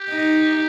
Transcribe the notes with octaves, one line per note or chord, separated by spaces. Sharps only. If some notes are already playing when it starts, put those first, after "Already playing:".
Already playing: G4
D#4